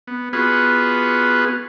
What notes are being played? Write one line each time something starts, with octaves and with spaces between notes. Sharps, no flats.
B3
B3 F4 F#4 G#4 B4